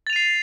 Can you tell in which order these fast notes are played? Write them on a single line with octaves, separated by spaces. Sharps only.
A6 F7 D#7 C7